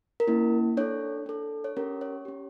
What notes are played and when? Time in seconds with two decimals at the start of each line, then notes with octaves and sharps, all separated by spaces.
0.20 A#4
0.27 A#3 C#4 E4
0.77 D4 A4 C#5
1.26 D4 A4
1.64 C#5
1.77 C#4 G4 A#4
2.01 C#5
2.25 C#4 G4